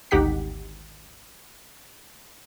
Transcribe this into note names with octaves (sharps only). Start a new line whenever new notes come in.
G#1 D2 D#4 G4 F#5 B6